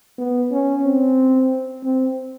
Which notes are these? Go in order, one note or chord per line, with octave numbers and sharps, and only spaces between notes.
B3
C#4
C4
C4